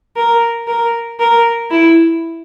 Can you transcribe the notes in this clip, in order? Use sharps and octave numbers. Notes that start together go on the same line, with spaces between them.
A#4
A#4
A#4
E4